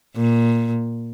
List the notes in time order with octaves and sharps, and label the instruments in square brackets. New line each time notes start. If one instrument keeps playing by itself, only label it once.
[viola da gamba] A#2